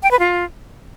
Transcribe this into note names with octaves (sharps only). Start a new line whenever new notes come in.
G5
B4
F4